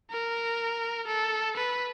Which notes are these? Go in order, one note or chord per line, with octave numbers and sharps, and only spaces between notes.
A#4
A4
B4